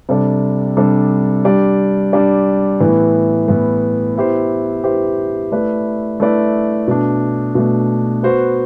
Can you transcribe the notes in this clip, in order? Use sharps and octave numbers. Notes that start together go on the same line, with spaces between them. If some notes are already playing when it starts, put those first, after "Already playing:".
C3 G3 D4 A4 D5
C3 G3 D4 A4 D5
G3 D4 G4 D5
G3 D4 G4 D5
A2 E3 B3
A2 E3 B3
B3 E4 G4 C5
B3 E4 G4 C5
A3 E4 B4 D5
A3 E4 B4 D5
B2 A3 D4
B2 A3 D4
B3 F#4 C5